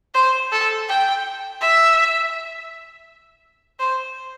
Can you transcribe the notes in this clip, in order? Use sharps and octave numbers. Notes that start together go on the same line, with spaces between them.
C5
A4
G5
E5
C5